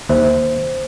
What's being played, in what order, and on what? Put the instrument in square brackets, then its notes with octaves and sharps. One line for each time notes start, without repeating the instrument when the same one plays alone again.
[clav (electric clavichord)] D#2 E5 [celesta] C5